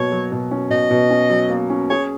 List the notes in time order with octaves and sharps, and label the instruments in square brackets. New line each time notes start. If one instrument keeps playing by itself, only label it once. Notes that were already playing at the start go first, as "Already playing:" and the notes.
Already playing: [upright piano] B2 F#3 A#3 [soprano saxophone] C#5
[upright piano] F#3
B2
C#4
[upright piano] B2 [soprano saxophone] D#5
[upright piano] B2
C#4
F#3
A#3
C#4
[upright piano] G#4 [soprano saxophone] C#5